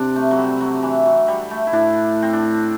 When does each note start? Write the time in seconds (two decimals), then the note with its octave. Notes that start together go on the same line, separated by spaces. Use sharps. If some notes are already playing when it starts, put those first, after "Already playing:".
Already playing: C3 D4
0.16 A3
0.31 F#3
0.37 G3
0.61 F#3
0.83 E3
1.06 F#3
1.28 G3
1.51 A3
1.67 E4
1.73 A2 D4
2.22 C4
2.33 D4